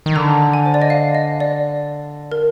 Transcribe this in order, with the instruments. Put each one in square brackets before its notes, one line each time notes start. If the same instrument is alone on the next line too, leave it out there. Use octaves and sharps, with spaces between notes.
[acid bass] D#3
[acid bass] D3 [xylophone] A#5
[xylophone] G#5
C5
D5
D#5
F5
D#5
D5
A#4